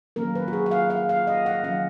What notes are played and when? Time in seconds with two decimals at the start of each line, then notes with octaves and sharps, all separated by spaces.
0.16 D#3 F#3 A#3 C#4 A#4
0.35 B4
0.48 F#4
0.53 G#4
0.66 F#5
0.71 F5
0.90 F5
1.09 F5
1.27 D#5
1.46 F#5
1.63 D#3 F#3 C#4 F5